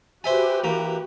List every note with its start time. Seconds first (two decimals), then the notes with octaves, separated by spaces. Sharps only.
0.24 F#4 G4 B4 C5 E5 G#5
0.64 E3 A#3